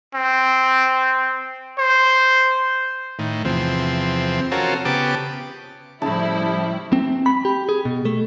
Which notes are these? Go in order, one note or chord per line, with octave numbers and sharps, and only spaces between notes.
C4
C5
A2 D#3
E2 C3 F3 C4
C4 C#4 F4 F#4 A4 A#4
C#3 B3 G4 A5 D6
A2 C#3 F3 G3 E4 A5
C4
B5
G4
G#4
B2
A3